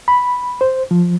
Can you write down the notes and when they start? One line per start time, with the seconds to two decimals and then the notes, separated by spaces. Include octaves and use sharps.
0.08 B5
0.61 C5
0.91 F3